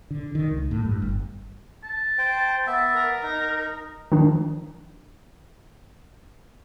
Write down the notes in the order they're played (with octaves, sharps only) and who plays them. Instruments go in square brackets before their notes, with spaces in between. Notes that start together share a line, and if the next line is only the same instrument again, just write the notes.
[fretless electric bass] D3
D#3
C#2
A2
G2
G1
[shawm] A5
[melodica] C5 G5
[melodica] B3 E5 [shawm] A5
[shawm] A#4
[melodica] D#4
[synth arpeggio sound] D#3 F3 D4